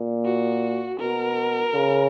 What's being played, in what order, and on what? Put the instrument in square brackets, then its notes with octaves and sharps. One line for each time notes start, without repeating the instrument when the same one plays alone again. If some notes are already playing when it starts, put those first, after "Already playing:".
Already playing: [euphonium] A#2
[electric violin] F#4
[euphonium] B2 [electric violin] A#4
[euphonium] C#3